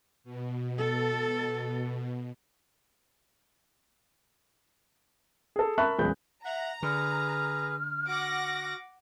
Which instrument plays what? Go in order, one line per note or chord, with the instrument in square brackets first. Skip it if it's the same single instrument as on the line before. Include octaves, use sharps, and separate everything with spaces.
[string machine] B2
[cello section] A4
[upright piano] G#4 A4
A#4 E5 A5 B5 C#6 F#6
D#1 B1 E2 G#3 B5 G6
[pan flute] E5 [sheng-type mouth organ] F#5 [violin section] A#5
[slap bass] D3 [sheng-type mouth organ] G#4 B4 [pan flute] F6
[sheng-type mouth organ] F#4 [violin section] F#5 D6 A#6